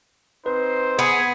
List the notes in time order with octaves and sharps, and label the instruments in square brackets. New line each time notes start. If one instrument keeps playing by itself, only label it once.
[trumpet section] C4 D#4 C5 [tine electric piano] B4
[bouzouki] B3 [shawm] G#4